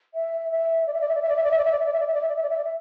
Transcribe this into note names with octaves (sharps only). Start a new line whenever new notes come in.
E5
E5
D5
E5
D5
E5
D5
E5
D5
E5
D5
E5
D5
E5
D5
E5
D5
E5
D5
E5
D5
E5
D5
E5
D5
E5
D5
E5